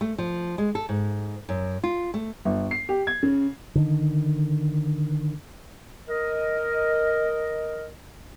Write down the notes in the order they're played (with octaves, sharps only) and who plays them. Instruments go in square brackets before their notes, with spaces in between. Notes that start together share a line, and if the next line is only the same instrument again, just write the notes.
[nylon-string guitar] A3
F3
G#3
A4
G#2
F#2
F4
A3
[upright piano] G1
C7
G4
G#6
C#3
[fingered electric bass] D3 D#3
[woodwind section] A#4 D#5